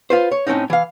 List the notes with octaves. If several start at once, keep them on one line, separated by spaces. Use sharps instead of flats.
F4 B4 C5
C#5
A2 A#3 C4 C#4 D#4
E3 F5